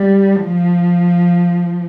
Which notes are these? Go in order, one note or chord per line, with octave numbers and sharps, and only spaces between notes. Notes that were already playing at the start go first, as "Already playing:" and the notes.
Already playing: G3
F3